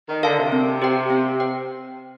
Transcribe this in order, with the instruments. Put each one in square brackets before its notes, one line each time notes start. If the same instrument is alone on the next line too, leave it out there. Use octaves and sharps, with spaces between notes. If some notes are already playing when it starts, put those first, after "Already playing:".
[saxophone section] D#3
[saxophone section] D3 [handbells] A#4 F5 A5
[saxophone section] C3
[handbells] C4
G4 C5 G5
C4
C5 G5